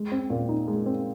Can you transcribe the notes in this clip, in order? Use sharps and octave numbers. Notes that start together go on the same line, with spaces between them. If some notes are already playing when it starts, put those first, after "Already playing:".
Already playing: G#3
C4
A#2
D#4
G#3
C4